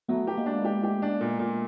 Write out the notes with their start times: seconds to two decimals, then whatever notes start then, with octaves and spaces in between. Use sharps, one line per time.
0.08 F#3 A3 B3
0.27 G4
0.37 G#3 A#3
0.46 D4
0.65 G4
0.83 G4
1.02 D4
1.21 A#2
1.39 A#2